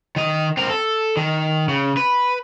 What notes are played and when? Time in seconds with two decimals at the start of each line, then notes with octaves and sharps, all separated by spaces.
0.16 D#3 D#5
0.57 C4 A#4
0.69 A4
1.17 D#3
1.69 C#3
1.97 B4